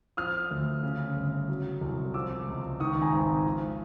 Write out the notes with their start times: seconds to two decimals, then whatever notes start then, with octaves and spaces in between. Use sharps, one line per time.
0.17 F3 D#6 F6
0.51 D2
0.83 C#3
1.16 G1
1.49 F#3
1.81 C2
2.14 F3 D6 E6
2.47 C#2
2.80 D#3 C#6 D#6
3.02 G#5 A#5
3.13 G#1
3.46 F3